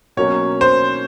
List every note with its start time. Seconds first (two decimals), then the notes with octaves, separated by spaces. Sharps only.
0.17 B2 F#3 A#3 C#4 C#5
0.61 C5